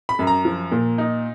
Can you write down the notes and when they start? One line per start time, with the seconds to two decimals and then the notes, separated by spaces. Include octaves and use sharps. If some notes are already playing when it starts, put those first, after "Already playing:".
0.09 B5
0.19 F#2
0.27 A#5
0.45 F3
0.72 A#2
0.98 D#4